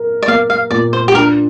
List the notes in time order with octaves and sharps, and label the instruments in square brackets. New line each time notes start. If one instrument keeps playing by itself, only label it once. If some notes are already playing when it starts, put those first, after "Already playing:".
Already playing: [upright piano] A#4
[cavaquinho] D5
[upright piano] A#3 [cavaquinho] F5
[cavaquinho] F5
[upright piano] A#2 [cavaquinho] D5
[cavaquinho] C5
G4
[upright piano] D4 [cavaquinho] A#4